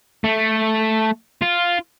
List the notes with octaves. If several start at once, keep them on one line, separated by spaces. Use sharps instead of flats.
A3
F4